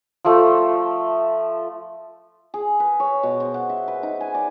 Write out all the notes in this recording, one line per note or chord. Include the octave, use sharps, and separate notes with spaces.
F3 A3
G#4
B4
C#5
B2
C5
F#5
E5
B4
D#4
G#5
D5